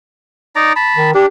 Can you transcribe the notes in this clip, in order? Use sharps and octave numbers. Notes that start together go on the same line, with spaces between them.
D#4 D5 A#5
A5 B5
D#3
D4 G4